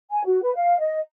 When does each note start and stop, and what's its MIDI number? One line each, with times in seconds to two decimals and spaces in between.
0.11 0.25 80
0.25 0.40 66
0.43 0.53 71
0.55 0.78 77
0.80 0.99 75